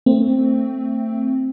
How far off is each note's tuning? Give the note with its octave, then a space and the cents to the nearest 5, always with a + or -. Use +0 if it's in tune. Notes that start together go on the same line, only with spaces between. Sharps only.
A3 +30 C4 +5